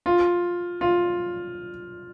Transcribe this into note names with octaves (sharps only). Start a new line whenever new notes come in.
F4
F4